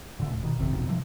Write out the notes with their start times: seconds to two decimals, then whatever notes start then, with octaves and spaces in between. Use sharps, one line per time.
0.20 A#2 D3 A3
0.32 D#1
0.43 B2 D#3
0.58 G#1 F2 C3 D#3
0.73 A1 F2 G#2 B2
0.88 C3 E3 F3